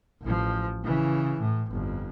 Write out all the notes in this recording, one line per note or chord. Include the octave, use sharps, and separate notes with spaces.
A1 F3
C#3 E3
A2
G1 F2